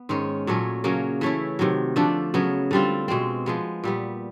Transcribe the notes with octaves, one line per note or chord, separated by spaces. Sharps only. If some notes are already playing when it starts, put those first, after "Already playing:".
Already playing: B3
G#2 D#3 G#3 C#4
A#2 F#3 A3 C#4
C#3 F#3 A#3 C#4
E3 A3 C#4 E4
C3 D#3 F#3
D3 F3 A3 D4
C#3 F#3 B3
D3 G3 C4 F4
B2 G#3 C4
F3 G#3 B3
A#2 G3 B3